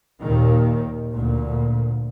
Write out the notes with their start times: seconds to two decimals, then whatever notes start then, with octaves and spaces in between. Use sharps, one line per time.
0.22 D#2 A#2 D#3
1.13 D2 A#2